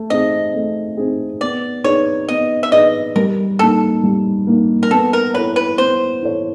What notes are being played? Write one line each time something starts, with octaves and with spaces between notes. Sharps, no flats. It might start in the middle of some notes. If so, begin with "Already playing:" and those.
Already playing: A3
C4 D#4 G#4 D#5
A3
C4 D#4 G#4
B3 D5
D#4 G#4 B4 C#5 D5
B3 D#5
E5
D#4 G#4 B4 D5 D#5
G3 A#4
A#3 D#4 A4
G3
A#3 D#4
A#4
B3 A4
A#4
E4 A4 B4 C#5
B4
B3 C5
E4 A4 C#5